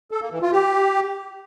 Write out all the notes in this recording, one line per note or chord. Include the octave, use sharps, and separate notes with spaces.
A4
A#3
E3
F4
G4